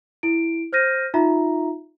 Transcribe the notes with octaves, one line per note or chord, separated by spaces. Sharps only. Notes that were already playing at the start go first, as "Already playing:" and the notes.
E4 D7
C5 F6 G6 A#6 D#7
D#4 F4 E5 A#5